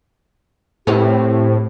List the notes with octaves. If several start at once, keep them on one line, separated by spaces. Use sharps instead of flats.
A2 C4 G4 B4 C#5